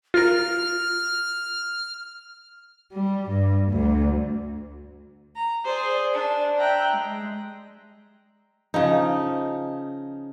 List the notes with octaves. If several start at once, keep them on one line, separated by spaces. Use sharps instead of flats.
F4 A#4 F6
G3
G2
D2
A#5
G#4 C5 D5
D4
E5 G5 A#5 F#6
G#3
C#3 F3 D#4